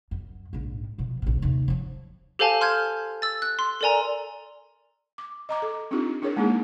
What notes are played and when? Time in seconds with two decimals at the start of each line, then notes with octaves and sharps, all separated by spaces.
0.11 F#2
0.53 A#1 G#2
0.98 B2 F3
1.22 A#1 A#2
1.42 D#2 C3
1.68 F3 F#3
2.39 G4 A4 C5 F5 G#5 A5
2.61 C6 F6 G6 G#6
3.22 E6 A6
3.42 F#6
3.59 C6
3.81 A4 A#4 D5 G#5 A#5
5.18 D6
5.49 D#5 A#5 D6
5.62 A4
5.91 C4 D4 D#4 F4 G4
6.22 D4 E4 G#4 A#4 C#5
6.37 G#3 A#3 B3 D#4 E4 G#4